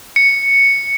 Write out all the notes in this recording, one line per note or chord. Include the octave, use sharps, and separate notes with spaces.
C#7